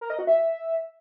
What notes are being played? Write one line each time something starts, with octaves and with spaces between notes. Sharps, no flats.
A#4
D#5
F#4
E5